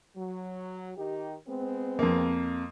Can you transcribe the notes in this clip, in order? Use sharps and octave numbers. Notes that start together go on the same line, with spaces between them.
F#3
D#3 D#4 G4
G#3 B3 C4
F2 A#3